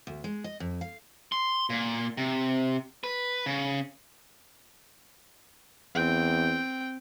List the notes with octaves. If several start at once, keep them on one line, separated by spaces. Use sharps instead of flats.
D2
G#3
D#5
F2
F5
C6
A#2
C3
B4
C#3
E2 C4 G5